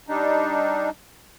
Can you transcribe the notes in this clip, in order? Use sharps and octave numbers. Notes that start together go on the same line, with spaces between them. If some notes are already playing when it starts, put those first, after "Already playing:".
G3 D4 D#4